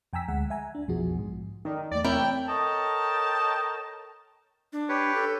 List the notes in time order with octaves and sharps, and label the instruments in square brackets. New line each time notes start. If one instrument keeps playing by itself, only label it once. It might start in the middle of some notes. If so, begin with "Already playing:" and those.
[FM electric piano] F2 G5 G#5 A#5 E6 B6
D2 G#3 F#5
E5 G#5 A#5
D4
B1 F2 F3 B3 F#4 G#4
G#2
[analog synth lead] D#3 [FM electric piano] A4 D5 D#5
[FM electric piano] E2 A3 [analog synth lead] D5
[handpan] C4 [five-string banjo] E4 A#4 C#5 [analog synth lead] G5
[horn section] A4 A#4 C#5 D#5 G5 A5
[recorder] D4
[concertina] G4 B4 C#5
[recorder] A4